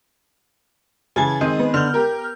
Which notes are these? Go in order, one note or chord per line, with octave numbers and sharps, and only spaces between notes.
C#3 E3 G#5 A5 G#6
D#3 G#3 C4 D#5
B3
D3 F6 G6
G4 A#4